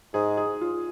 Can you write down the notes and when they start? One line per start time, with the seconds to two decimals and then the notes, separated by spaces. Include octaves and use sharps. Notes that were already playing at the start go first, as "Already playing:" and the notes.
0.14 G#2 G#4
0.37 G#4
0.61 F4